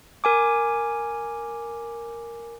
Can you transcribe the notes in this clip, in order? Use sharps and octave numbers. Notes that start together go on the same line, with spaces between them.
A#4 G#5 D6